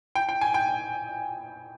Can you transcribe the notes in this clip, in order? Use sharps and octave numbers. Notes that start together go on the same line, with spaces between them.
G5
G5
G#5
G5